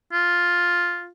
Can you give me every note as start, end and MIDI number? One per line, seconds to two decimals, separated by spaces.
0.13 1.09 65